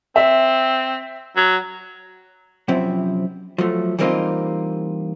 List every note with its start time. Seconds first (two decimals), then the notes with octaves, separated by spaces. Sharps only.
0.16 C4 E5
1.37 F#3
2.68 F#2 C3 F3 C4 E4
3.58 F3 F#3 A3
3.99 E3 G3 A#3 C4 D#4 F4